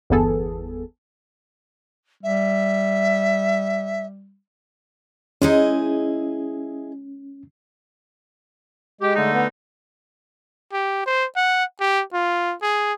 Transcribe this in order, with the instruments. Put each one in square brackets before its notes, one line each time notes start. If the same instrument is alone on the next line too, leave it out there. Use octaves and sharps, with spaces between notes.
[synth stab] G1 E2 E3 B3 G#4 A4
[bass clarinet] G3 [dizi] E5
[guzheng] G#3 D#4 [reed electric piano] C#4 [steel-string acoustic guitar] E4 G#4 D#5
[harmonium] G#3 [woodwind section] G4
[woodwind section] D3 A3 D#4
[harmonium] B3
[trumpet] G4
C5
F#5
G4
F4
G#4